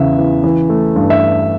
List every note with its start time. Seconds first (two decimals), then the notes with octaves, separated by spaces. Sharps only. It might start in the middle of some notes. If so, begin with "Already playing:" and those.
Already playing: E2 C#3 E3 B3 E5
0.19 E3
0.44 E3
0.69 A3
0.96 G2
1.10 E5